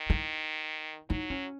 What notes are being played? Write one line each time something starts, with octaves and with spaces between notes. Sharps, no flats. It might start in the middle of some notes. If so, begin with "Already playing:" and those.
Already playing: D#3
D#4
F#3 D#4
C#4